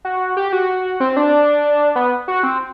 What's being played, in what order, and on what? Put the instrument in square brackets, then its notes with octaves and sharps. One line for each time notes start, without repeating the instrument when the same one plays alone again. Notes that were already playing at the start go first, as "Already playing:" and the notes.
[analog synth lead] F#4
G4
F#4
C4
D4
B3
F#4
C4